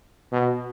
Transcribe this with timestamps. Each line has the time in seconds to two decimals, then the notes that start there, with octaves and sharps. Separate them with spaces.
0.32 B2